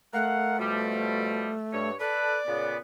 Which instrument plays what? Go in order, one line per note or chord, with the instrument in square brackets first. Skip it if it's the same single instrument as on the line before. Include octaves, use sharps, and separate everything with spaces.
[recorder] A3 [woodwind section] A#4 F5 F#5
[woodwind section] B2 F3 G3
G2 C#5
[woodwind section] A4 B4 [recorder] D5
[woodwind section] A#2 C#3 B3